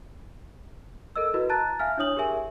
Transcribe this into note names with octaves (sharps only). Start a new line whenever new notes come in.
A4 A#4 D#5 E6
E4 F#4 B4 D#5
A5 A#5 F#6 A6
E5 F5 G#5 F6
D4 E4 C#5 D#6 F#7
G4 G#4 A#4 E5 G#5